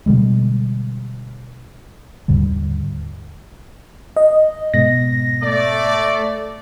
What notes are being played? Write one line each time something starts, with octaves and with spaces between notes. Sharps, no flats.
B2 D3 G3 G#3
D#2 G#2 D3 G3
D#5
G#2 B2 A#6
A3 D5